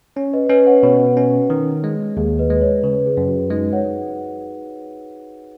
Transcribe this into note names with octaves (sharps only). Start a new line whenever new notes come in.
C#4 C#5
B4 D#5
C#4 B4 D#5
C#5 F#5
B2 C#5
C#4
D#3
G#3
D#2 G#4
B4 D#5
G#3
C#5
C#3 B4
G#4
F#2
F#4
G#3 D#4
C#5 F#5